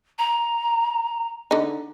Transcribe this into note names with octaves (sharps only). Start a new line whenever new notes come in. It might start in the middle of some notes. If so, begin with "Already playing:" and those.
A#5
D3 D#4